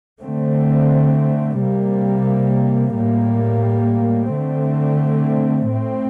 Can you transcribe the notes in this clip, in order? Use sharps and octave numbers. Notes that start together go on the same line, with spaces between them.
D3 A3 C4
C3 G3 A#3
A2 G3 A#3
D3 A3 C4
A2 A3 C4